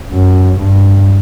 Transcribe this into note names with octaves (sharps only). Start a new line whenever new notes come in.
F#2
G2